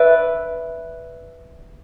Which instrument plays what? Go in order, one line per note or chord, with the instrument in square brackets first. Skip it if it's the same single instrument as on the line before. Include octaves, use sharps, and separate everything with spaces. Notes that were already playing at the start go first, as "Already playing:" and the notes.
Already playing: [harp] B4 D5 E5